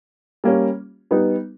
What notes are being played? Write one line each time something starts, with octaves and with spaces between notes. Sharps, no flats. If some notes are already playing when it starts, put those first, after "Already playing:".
G3 A#3 C#4
G3 B3 D#4